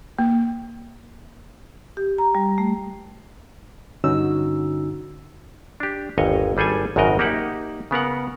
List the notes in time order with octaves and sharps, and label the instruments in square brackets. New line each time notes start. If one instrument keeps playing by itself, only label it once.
[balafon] A#3
[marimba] G4
A#5
G3
A3
[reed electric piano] G2 D3 C#4 D#4 F#4 E6
[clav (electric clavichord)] D4 G4
G1 D#2 C#5 D#5 G#5
G#1 G3 G#4 A4 G#5
G#1 F#2 C#3 F#4 A#4 D#5
A#3 D#4 G4 E5 F#5
C#3 B3 A#4 F#5